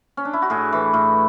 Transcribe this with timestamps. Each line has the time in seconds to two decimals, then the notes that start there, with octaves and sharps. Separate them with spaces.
0.17 C#4
0.25 D4
0.33 E4
0.42 F#4
0.50 A2 G#4
0.73 E3
0.94 A2